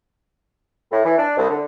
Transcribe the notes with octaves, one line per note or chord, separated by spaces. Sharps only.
A2
E3
D4
C2
D3